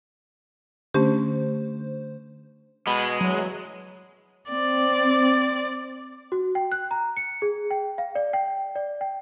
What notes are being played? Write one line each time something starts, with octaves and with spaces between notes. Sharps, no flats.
D3 A3 C#4 G4 C5
B2 G#3 B5
E2 F#3
C4 D5
F#4
G5
F#6
A#5
C#7
G#4
G5
F5
D5
G5
D5
G5